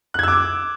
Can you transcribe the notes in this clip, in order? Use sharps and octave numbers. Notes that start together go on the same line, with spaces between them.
D6 E6 F#6 G#6